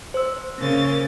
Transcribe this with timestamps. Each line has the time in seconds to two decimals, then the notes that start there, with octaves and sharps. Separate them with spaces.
0.14 C5 E6
0.59 C#3 A#3 A6